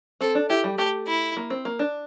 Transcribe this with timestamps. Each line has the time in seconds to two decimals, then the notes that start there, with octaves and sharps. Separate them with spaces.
0.21 C4 A4
0.35 D4
0.50 E4 G4
0.64 G3
0.78 A3 G4
1.07 E4
1.37 A#3
1.50 C4
1.65 A#3
1.79 D4